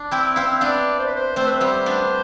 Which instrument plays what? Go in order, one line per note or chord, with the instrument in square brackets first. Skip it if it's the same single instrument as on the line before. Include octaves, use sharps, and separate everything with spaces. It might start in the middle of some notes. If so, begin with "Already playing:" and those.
Already playing: [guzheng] D4
[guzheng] C4 E4 [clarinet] G5
[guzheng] C4 E4 [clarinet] F5
[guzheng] B3 D4 [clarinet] D5
[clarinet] C5
B4
C5
[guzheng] A3 C4 [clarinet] C5
[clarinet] B4
[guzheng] G3 B3 [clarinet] C5
[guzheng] B3 D4